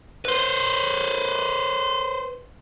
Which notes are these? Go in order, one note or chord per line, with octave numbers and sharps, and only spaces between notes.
B4 C5